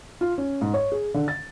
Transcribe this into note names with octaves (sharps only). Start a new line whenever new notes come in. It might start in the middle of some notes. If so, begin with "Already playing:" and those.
F4
C#4
G#2
C#5
G#4
D3
A6